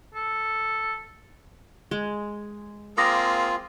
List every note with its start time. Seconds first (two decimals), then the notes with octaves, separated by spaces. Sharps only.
0.15 A4
1.91 G#3
2.98 A#3 C4 F4 G#4 D6 D#6 A#6